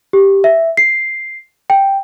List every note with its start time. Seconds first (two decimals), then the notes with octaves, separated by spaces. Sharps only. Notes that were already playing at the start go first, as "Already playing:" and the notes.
0.13 G4
0.44 E5
0.77 C7
1.70 G5